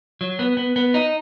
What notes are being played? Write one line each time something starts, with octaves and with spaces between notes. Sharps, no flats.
F#3
B3
B3
B3
D#4